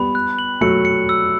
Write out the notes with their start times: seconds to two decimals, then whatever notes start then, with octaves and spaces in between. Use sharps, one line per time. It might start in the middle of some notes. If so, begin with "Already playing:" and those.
Already playing: G3 B3 B5
0.15 F#6
0.39 F#7
0.61 F#3 A3 C#7
0.85 C#7
1.09 E6